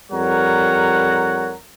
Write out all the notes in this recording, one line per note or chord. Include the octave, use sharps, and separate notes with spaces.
F2 G3 A#4 C#5 F#5 A#5